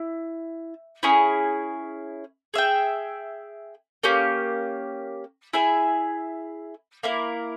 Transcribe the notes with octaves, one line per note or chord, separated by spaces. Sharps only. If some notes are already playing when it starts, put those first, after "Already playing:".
Already playing: E4
C#4 E4 G#4
G#4 E5 G5
A#3 C#4 G4
E4 G#4 E5 G#5
A#3 E4 A#4